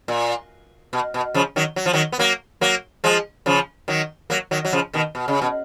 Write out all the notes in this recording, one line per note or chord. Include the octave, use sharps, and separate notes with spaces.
A#2
B2
B2
C#3 F3
D#3 F#3
F#3
F3
D#3 F#3
B3
F#3 A#3
F#3 A#3
F3 G#3
C#3 F3
D#3 F#3
F#3 A#3
D#3 F#3
F#3
C#3 F3
B2 D#3
B2
C#3
B2